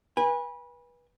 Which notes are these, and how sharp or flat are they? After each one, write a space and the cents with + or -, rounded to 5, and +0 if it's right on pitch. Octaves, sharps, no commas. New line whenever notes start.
B4 -25 G#5 -30